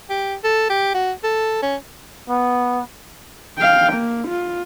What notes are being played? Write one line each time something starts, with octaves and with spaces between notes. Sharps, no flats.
G4
A4
G4
F#4
A4
C#4
B3
F5 G5
A#3
F4